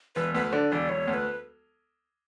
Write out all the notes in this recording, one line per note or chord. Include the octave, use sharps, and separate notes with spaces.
E1 B4
D2 B4
D3 D5
E1 D5
E1 C#5
D2
B4